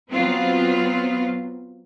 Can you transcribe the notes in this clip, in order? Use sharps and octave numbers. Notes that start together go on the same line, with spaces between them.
F#3 B3 C4 F4